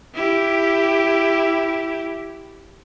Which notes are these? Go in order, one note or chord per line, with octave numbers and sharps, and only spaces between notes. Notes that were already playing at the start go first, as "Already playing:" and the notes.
E4 G4